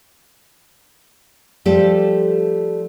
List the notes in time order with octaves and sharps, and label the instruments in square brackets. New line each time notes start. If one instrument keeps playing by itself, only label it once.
[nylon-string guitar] F3 G3 A3 G4 A4 D5